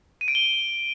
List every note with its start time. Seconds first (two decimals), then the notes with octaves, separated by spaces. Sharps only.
0.21 D#7
0.28 D7
0.35 G7